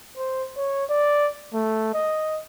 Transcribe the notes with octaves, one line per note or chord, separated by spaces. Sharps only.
C5
C#5
D5
A3
D#5